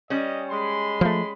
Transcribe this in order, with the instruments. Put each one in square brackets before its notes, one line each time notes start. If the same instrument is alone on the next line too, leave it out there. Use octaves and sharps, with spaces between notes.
[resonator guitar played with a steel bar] G3 C#4 [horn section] D#5
[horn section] G#3 B5 C6
[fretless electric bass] F3 A3